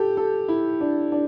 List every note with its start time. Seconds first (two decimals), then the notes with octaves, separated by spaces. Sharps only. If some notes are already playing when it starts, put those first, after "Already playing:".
Already playing: G4 A4
0.17 A4
0.48 E4
0.81 D4
1.12 D4